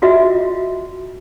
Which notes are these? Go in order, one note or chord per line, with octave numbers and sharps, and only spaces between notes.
F4 F#4 D#5 E5